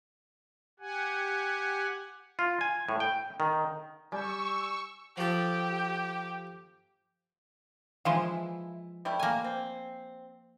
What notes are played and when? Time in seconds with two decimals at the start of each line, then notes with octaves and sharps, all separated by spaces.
0.80 G4 F#5 G#5
2.39 F4
2.61 G#5
2.89 A2
3.00 G5
3.40 D#3
4.12 G3 G#5 C#6 D6 E6 G6
5.17 F3 G4 A4
8.05 E3 F3 G#3 E4 F5 C6
9.05 G3 A3 E4
9.19 A#3 G#5
9.44 C4